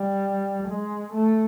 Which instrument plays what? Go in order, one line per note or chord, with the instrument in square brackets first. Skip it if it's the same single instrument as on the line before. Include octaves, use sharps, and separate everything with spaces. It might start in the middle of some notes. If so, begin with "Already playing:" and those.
Already playing: [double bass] G3
G#3
A3